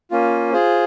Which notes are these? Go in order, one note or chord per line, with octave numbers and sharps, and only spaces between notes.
A#3 C#4 F4
F4 G#4 C5